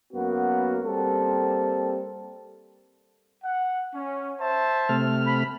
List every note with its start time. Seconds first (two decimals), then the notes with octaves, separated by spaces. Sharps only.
0.13 F#2 A#3 B3 F#4
0.84 G3 A#3 C4 A4
3.44 F#5
3.94 C#4
4.39 C5 E5 A5
4.89 C3 A3 F6
5.26 B5